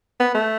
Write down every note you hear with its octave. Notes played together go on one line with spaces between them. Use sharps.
B3
A3